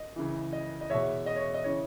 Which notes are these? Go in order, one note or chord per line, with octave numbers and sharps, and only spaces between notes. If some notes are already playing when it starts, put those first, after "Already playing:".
Already playing: D#5
C#2 C#3 E3
D#5
D#5
E2 B2 C#5 E5
D#5
C#5
D#5
C#3 E3 C#5